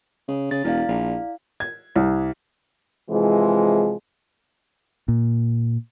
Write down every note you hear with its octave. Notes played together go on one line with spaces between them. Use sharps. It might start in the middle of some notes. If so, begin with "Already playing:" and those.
C#3
C#3 A6
E1 E4 D5 F5
A#1
G#6
C2
C3 E3 F3 G#3
A#2